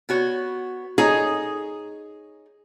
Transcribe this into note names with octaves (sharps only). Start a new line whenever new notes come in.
B3 F#4 C#5
D#4 G#4 C#5